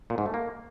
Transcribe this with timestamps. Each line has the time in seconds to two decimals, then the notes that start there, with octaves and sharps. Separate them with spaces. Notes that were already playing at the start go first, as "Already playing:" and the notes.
0.10 A#2
0.18 G#2
0.26 A3
0.34 A#3